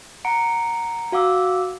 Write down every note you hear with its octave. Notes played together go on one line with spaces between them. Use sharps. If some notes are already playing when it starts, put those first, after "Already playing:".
F#5 A#5 C#7 D7
F#4 F5 F#5 D6 E6